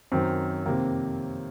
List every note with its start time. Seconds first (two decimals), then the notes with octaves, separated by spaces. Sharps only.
0.12 F#2 D#3 C4
0.66 F2 C3 D#3 A#3